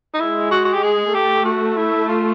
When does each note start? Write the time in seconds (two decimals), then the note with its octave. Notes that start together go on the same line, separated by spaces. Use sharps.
0.14 D#4
0.20 G#3 E4
0.51 F#4
0.65 F#4
0.73 G4
0.83 G#4
1.14 A3 G4
1.45 F#4
1.77 E4
2.09 F4